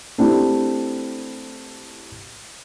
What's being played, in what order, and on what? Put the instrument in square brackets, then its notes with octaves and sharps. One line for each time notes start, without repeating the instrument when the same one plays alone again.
[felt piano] A3 C4 D4 E4 G4